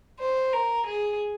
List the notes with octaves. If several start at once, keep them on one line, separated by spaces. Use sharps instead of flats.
C5
A#4
G#4